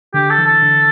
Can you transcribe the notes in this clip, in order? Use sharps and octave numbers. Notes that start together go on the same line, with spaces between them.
D3 G4
A4
E3
A4
D3